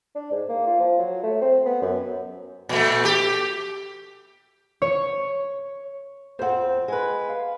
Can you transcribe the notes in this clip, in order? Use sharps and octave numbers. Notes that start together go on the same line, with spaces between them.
D4
G#2
A#3
F4
F3
F#3
A3
C4
B3
F#2
A#2 A3
G4
C#5
F2 C4 C5 F#5
G#3 B4
F5